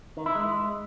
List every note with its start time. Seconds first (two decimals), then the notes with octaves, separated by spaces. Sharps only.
0.17 D#3
0.26 E4
0.35 G#3